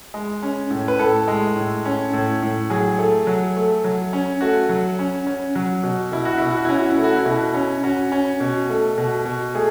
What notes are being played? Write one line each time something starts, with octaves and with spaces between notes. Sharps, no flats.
G#3
C#4
A2
B4
A2 A4
G#3
A2
C#4
A2
A2
F#3 G#4
A3
F#3
A3
F#3
C#4
A3 F#4
F#3
C#4
C#4
F#3
B2
B2 E4
F#4
B2 E4
F#4
C#4 E4
F#4
E4
A3
F#4
E4
B2
C#4
C#4 F#4
C#4
B2
A3
B2
B2
A3 G#4